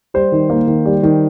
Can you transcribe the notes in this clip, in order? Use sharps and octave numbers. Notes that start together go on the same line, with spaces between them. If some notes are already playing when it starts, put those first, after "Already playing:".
G3 C5
D#3
A#3
D#3
G3
D#3